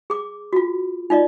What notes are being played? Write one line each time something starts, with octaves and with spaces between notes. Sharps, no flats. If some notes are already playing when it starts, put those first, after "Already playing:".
G#4 D6
F4 F#4
D#4 F4 D5 D#5